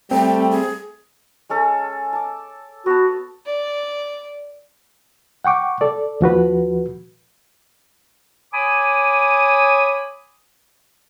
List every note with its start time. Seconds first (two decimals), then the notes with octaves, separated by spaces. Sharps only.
0.11 G3 A3 C4 G5
0.51 G#4
1.50 G#3 C#4 A4
2.13 A5 D6
2.86 B3 F#4 A5
3.46 D5
5.44 F#5 G5 C#6 D6
5.81 A4 D5
6.21 D#2 F3 F#4 B4
8.53 C#5 G#5 B5 D6 D#6